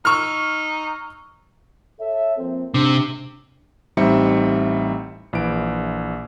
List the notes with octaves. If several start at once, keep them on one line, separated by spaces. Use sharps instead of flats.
D#4 C#6 E6 F6
A4 C#5 E5
F3 A#3 C4
G#2 C3 D4
A1 G3 C4 D#4 E5 C#7
A#1 E3 D7